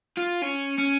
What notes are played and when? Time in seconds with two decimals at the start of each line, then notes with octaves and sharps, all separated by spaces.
0.17 F4
0.42 C#4
0.78 C#4